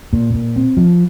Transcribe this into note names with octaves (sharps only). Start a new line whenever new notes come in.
A#2
A#2
C4
F3